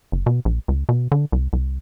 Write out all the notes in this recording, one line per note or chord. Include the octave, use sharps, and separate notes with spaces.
F#1
B2
A#1
C#2
B2
D3
C2
C2